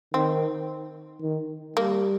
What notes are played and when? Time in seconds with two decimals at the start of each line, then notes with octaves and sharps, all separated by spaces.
0.14 D#3 C4
1.22 D#3
1.76 G3 A#3